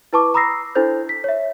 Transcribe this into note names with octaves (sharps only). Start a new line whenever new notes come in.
E4 B4 A5 C#6 D6
A#5 B5 D#6 E6 A#6 C7
D4 E4 A4 C5 G6
B6
C#5 E5